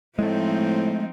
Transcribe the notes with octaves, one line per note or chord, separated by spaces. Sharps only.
A2 F3 G#3 A3 C4 D#4